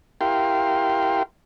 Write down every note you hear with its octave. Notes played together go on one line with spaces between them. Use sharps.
E4 G4 A#4 F5 G5 C6